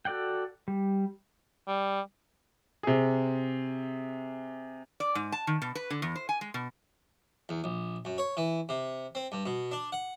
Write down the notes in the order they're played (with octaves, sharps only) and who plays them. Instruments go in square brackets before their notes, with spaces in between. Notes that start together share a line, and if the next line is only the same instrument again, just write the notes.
[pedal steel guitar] F#4 A4 D5 F#5 G5
G3
[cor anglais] G3
[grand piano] C3 G#4
[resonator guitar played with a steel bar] D5
G#2
A5
D#3
B2
B4
D3
E2
C5
G#5
G#3
B2
[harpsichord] E2
A#1
F#2
C#5
E3
C3
C4
G2
B2
D4
F#5